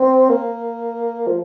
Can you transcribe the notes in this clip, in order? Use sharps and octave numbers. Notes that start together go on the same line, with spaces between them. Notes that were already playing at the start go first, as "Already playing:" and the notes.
Already playing: C4
A#3
F3